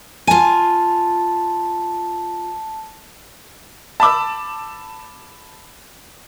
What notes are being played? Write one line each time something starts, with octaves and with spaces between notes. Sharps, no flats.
F4 G#5 A5
A5 B5 D6 E6